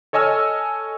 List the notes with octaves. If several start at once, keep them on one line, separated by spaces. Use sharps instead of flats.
A4 C#5 D#5 G#5 E6 F6